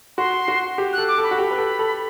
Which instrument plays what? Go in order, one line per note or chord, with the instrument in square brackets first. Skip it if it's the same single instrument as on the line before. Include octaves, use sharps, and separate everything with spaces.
[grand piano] F#4 [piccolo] C6
[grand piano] F#4
G4
[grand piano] A4 [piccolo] F#6
[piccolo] D6
[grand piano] A4
[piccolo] B5
[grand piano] F#4
G4
B4
A4
A4